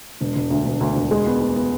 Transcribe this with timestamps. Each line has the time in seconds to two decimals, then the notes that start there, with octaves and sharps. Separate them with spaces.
0.21 E1
0.35 E1
0.50 D2
0.65 E1
0.81 D2
0.96 E1
1.11 G#3
1.26 B3
1.41 B3
1.56 B3